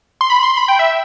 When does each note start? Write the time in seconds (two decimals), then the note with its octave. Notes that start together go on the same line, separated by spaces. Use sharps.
0.21 C6
0.30 B5
0.43 C6
0.57 B5
0.68 G5
0.79 E5